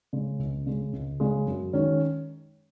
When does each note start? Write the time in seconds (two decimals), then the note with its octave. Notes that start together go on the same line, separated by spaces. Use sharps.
0.13 C#3 G#3
0.39 C#2
0.66 C#3 G#3
0.93 C#2
1.20 C#3 G#3
1.47 F#2
1.73 D#3 G#3 C#4